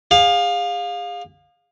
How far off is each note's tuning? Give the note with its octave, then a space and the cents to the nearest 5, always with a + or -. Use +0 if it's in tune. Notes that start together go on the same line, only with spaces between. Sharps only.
G#4 -35 F5 +20